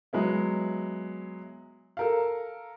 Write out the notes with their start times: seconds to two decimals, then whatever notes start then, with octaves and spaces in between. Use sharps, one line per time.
0.13 F#3 G#3 B3 E4
1.97 A4 A#4 F5